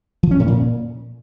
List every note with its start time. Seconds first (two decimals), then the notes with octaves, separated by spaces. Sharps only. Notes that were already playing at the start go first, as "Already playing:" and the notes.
0.23 F3
0.31 C#4
0.39 A2
0.48 A#2